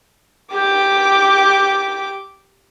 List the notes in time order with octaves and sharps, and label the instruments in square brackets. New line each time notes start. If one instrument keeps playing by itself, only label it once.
[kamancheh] G4 D6